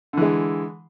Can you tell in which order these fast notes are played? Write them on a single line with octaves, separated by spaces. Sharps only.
D3 E3 G#3